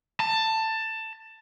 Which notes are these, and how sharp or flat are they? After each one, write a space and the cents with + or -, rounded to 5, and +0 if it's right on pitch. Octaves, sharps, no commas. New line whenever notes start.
A5 +15